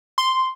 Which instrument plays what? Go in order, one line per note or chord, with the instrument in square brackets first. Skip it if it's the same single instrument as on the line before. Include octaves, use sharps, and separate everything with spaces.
[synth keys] C6